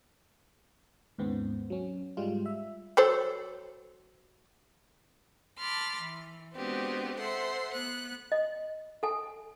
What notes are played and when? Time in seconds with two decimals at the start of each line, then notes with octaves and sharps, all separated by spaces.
1.18 D#2 G#2 C#3 B3 C4
1.70 F#3 C#4
2.17 G#2 G3 G#3 F4
2.46 E5
2.97 F#3 A4 C5
5.59 A5 B5 C6 D6 F6
5.99 E3
6.55 G#3 B3 C4 D4 F#4 G4
7.19 A4 C5 E5 F#5 C6
7.72 B3 F#6
8.32 D#5
9.03 A4 G#5